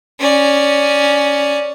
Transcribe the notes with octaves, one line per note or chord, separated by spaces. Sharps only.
C#4 D5